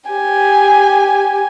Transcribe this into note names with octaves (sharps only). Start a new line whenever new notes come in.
G4 G#5